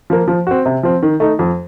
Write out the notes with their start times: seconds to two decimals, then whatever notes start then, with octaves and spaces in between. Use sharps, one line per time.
0.10 F3 A#3
0.28 F3
0.47 C4 F#4
0.66 C3
0.83 F3 C4
1.03 D#3
1.20 A3 D#4
1.39 F2